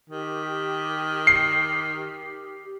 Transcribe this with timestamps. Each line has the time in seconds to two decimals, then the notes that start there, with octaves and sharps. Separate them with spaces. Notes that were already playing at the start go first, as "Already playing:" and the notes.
0.09 D#3 G4
1.27 C7